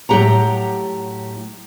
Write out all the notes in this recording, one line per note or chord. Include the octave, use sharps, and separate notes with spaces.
A2 F#3 A3 G4 F#5 A#5